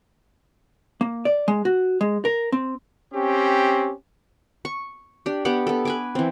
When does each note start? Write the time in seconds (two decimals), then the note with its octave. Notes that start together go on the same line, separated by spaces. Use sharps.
1.01 A#3
1.25 D5
1.48 G#3
1.65 F#4
2.01 G#3
2.25 A#4
2.52 C4
3.14 C4 C#4 G4
4.65 C#6
5.26 D4 G4
5.45 B3 G4 F#5 D6
5.67 B3 A4
5.85 B4 G#5 D6
6.15 E3 C4